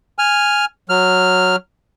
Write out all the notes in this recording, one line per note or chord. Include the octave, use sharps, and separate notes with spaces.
G#5 F6
F#3 F6